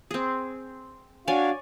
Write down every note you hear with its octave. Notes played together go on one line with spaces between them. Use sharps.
C4 G#4
D4 F#4 C#5 D5 F5 G#5